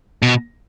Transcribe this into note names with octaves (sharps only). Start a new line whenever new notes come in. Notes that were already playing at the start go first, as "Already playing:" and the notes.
B2